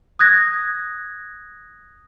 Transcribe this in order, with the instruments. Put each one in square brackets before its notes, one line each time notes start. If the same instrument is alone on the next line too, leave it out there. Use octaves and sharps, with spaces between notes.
[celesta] D#6 F#6 G#6 A#6